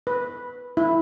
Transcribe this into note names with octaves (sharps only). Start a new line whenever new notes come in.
B4
E4